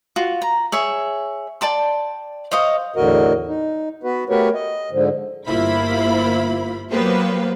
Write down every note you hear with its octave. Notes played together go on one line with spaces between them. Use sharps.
F4 F#4
A#5
G#4 C#5 E5
D5 G5 A5 C6
C5 C#5 D#5 F5
E2 A2 D3 F#4 A#4 D#5
D#4
B3 F#4 B4
A3 F#4 G4 A#4 B4 C#5
D#5
G#2 D3 F3
G1 A#3 E4 F4 C5 B5
F#3 A#3 B3 G4 B4 C5